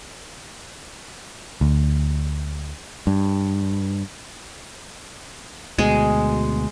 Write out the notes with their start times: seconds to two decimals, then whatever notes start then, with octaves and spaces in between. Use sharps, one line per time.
1.61 D2
3.07 G2
5.79 D2 B2 G#3